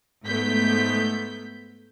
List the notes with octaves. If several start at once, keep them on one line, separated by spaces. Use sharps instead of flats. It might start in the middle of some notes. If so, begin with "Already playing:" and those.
G#2 A3 B3 G6 B6